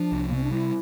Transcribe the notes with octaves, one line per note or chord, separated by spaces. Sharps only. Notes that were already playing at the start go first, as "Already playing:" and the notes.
Already playing: F3 D4
C2
A#3
C3 C4
D4
G3 E4